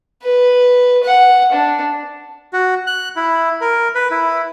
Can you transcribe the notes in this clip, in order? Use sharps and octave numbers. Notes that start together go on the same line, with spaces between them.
B4
F#5
D4
F#4
F#6
E4
A#4
B4
E4